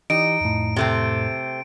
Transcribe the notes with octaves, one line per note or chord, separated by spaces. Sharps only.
E3 D#4 G4 D7
F2 A2
C3 A3 C4